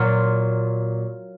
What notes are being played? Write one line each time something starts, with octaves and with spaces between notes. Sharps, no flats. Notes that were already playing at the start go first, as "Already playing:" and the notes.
Already playing: A#2 F#3 A#3 F4